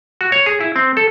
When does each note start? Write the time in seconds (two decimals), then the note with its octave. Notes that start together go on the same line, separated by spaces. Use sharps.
0.21 F#4
0.32 C#5
0.46 G#4
0.61 E4
0.76 C4
0.97 A4